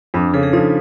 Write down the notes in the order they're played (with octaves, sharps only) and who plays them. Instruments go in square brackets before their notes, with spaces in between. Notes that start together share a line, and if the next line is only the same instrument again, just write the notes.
[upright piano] F2 [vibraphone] D4
[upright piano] C#3 [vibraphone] A4
[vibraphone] G#4
[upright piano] F3 [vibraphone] D#4